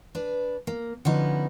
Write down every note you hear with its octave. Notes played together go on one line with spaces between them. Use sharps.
D4 B4 D5
A#3
D3 F3 B3 C#4 D#4 E4